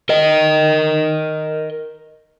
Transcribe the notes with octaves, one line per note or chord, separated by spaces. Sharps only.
A#4 D#5